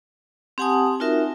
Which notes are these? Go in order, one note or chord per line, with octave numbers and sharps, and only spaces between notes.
C4 G4 F#5 G#5 A5 D#6
D#4 F4 F#4 A#4 E5